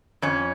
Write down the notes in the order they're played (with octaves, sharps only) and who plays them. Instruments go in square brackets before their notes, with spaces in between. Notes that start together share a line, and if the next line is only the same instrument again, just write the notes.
[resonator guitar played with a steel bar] F2 C#4